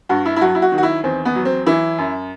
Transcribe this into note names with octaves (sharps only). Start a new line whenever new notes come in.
G2 F#4
E4
E4
F#3 F#4
E4
F#4
D#3
F#4
E4
E2 C4
B3
F#3
C4
E3 E4
F#2